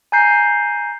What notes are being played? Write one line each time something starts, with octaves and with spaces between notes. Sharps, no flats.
G#5 A#5 G6 C7